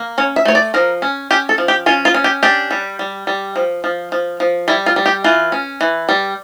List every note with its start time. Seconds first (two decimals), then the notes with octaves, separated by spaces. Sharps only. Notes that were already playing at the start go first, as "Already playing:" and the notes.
Already playing: A#3
0.18 C#4 C#5
0.36 E5
0.45 A3 C#5
0.55 D5
0.74 F3 A#4
1.02 C#4
1.31 C#4 G4
1.49 A4
1.58 F3
1.68 G4
1.86 C#4 F4
2.05 F4
2.14 C#4
2.24 G4
2.43 D4 G4
2.71 G3
2.99 G3
3.27 G3
3.56 F3
3.84 F3
4.12 F3
4.40 F3
4.68 G3 E4
4.86 F4
4.96 G3
5.06 G4
5.24 E3 F4
5.52 C#4
5.81 E3
6.09 G3